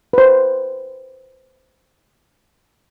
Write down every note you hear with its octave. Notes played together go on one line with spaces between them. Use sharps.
B4 C5